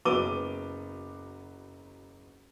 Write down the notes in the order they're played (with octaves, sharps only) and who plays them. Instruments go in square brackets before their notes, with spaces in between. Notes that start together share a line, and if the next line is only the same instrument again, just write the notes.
[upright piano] F#1 F#3 B3 D6 D#7 G7